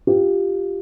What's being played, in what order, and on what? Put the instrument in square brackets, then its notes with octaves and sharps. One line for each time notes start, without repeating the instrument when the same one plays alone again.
[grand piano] F4 G4